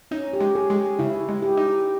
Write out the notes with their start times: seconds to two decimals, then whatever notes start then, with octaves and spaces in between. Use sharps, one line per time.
0.11 C#4 D#4
0.33 G4
0.41 G#3
0.55 G#4
0.70 G#3
0.99 C#3 E4
1.29 G#3
1.42 G4
1.57 D#4